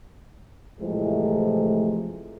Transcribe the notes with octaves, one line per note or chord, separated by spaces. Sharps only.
A2 C3 E3 F3 G#3 A3